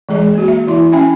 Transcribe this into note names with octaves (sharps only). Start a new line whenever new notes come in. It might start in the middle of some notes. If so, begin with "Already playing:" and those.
E3 G#3 G#4 D#5
A#3 F#4
E5
E3 E4 C6
C#4 E5 G5 G#5 B5